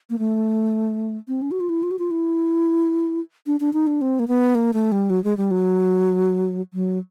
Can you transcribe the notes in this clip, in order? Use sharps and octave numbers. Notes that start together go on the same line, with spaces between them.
A#3
A3
C4
C#4
F#4
F4
E4
F4
F#4
F4
E4
D4
D4
D#4
D4
C4
A#3
B3
A#3
A3
G3
F#3
G#3
G3
F#3
F#3